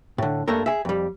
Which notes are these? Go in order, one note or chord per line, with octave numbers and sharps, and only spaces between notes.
A2 D3
G2 A3 A#3 A4 A#4
G#4 E5
F2 G3